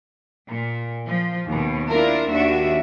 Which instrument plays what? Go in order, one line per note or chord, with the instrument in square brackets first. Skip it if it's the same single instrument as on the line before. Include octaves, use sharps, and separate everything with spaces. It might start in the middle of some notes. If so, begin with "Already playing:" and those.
[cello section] A#2
F3
D#2 B2
D4 E4 F4 A#4
D#2 D4 F#4 E5